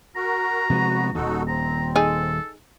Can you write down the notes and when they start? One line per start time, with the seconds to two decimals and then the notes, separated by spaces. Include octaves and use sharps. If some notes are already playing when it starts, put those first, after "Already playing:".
0.16 F#4 A#4 A#5
0.70 C3 F3 G#3 B3 F#4
1.15 D#1 D#2 D#4 F#4 A4
1.48 C4 A#5
1.96 D#4 G#4 A4